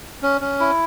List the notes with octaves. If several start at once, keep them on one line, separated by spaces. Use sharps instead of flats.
C#4
C#4
E4